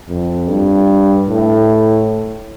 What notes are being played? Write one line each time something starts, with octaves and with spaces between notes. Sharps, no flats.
F2
G2
A2